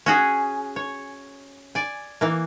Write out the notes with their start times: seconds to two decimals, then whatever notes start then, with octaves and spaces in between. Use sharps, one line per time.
0.06 C#4 F#4 G#4
0.76 C#5
1.75 D5 G#5
2.21 E3 A#3